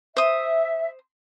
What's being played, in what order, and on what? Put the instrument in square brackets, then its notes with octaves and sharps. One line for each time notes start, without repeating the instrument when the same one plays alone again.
[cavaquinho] C5 D#6 [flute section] E5